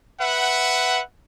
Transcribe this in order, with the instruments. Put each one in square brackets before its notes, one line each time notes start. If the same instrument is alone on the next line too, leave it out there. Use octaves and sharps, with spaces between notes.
[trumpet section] B4 E5 F#5